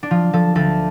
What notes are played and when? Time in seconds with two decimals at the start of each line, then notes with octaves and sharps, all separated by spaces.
0.03 D4
0.11 F3 F4
0.33 F3 A4
0.55 D2 A4